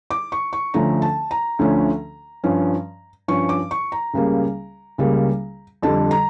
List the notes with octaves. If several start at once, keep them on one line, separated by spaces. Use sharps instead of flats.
D6
C#6
C#6
D2 D3 F3 A3 C#4 A#5
A5
A#5
D2 D3 F3 A3 C#4
G2 F3 C#4
G2 F3 C#4 C#6
D6
C#6
A#5
C#2 C#3 G3 A#3
C#2 C#3 G3 A#3
F2 D3 G3 A5
A#5